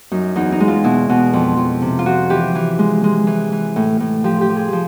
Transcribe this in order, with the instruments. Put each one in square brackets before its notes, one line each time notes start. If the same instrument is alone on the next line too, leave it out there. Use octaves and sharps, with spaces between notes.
[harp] F#2 D#4
E2 D#4
D#4
G#3
F4
B2 E4
B2
F2
F2
C3
F4
F3 F#4
E3 G4
E3
G#3
G#3
E3
E3
A2
A2
F3 G4
G4
F3
G#4
F3